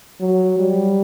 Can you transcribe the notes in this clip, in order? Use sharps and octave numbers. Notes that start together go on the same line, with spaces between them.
F#3
G3